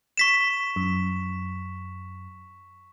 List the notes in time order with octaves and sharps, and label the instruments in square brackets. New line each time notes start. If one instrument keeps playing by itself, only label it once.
[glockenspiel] C#6 B6 E7
[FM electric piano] F#2